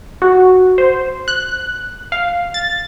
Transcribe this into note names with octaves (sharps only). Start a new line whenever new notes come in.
F#4
C5
F#6
F5
A6